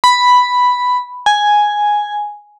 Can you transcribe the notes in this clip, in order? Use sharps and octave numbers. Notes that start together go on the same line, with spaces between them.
B5
G#5